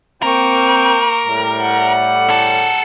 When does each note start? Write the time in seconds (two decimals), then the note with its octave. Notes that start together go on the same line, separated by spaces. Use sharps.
0.22 A#3 C4 A#4 G5 C#6
1.26 A2 G3
1.61 F#5
2.30 G#4 A4